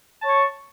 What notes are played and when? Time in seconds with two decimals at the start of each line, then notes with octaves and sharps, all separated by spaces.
0.22 A5
0.25 C#5
0.28 C#6